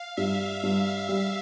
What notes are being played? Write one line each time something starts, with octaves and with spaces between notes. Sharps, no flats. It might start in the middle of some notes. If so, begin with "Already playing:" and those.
Already playing: F5
G2 E5
G2
G3